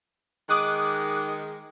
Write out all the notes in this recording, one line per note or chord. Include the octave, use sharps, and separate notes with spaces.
D#3 G#3 D6 D#6 F#6